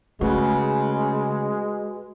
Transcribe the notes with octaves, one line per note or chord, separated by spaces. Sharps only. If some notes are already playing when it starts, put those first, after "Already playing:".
C#3 G#3 A3 F#4 B4